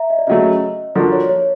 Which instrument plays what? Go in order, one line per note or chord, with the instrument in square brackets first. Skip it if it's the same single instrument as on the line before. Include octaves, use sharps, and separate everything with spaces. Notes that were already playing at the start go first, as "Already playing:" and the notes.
Already playing: [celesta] E5 A#5
D#5
D5
[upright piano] C#3 F#3 A3 [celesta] D#5
[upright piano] F3 A#3 D4 F#4 A4 [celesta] D5
[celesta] C#5
C#5